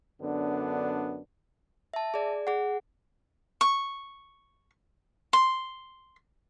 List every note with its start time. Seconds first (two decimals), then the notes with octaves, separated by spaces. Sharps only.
0.21 F#2 D3 B3 D4
1.94 E5 A5
2.14 G#4 D5
2.47 G#4 F#5
3.61 C#6
5.33 C6